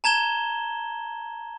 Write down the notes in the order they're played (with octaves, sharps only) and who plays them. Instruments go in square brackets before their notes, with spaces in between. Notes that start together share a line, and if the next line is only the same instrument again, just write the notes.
[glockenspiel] A5 A#5 G#6 E7 G7